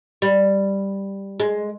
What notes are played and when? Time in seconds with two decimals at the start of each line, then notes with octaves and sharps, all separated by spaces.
0.22 G3
1.40 G#3